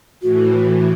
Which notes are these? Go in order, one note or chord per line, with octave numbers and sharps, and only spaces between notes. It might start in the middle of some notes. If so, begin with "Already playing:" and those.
A2 E3 F#4